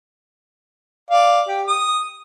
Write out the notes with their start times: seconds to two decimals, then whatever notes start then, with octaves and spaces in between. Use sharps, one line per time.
1.10 D5 F5
1.48 G4
1.68 D#6